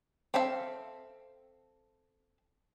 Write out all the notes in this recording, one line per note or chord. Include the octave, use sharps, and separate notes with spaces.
C4 A4 E5 F5